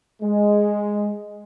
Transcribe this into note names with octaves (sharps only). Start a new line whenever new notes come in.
G#3